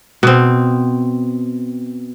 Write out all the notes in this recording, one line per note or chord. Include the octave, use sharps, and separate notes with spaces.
B2 C4